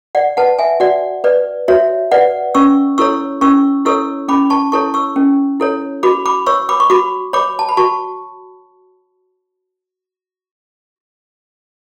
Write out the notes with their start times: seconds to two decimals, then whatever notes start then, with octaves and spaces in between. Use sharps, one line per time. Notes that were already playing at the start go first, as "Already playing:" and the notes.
0.15 D5 F#5
0.37 B4 F#5 A5
0.59 E5 G#5
0.80 F#4 D5 F#5
1.24 B4 D5
1.68 F#4 C#5 E5
2.11 B4 D5 F#5
2.55 C#4 C#6 E6
2.98 E4 A4 C#5 C#6 E6
3.41 C#4 C#6 E6
3.85 E4 A4 C#5 C#6 E6
4.28 C#4 B5 D6
4.50 A5 C#6
4.72 E4 A4 C#5 A5 C#6
4.94 C#6 E6
5.16 C#4
5.60 E4 A4 C#5
6.03 F#4 B5 D6
6.26 B5 D6
6.46 C#5 C#6 E6
6.69 B5 D6
6.80 C#6
6.90 F#4 B5 D6
7.33 C#5 B5 D6
7.59 A5
7.69 B5
7.77 F#4 A5 C#6